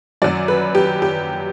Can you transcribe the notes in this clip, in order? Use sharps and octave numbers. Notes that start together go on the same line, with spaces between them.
F#2 F#3 D5
B4
G4
G4